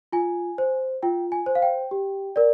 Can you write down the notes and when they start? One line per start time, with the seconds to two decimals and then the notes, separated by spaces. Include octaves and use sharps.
0.12 F4 G#5
0.58 C5
1.03 F4 G5
1.32 G#5
1.46 C5
1.55 F5
1.62 G5
1.91 G4
2.36 A#4 D5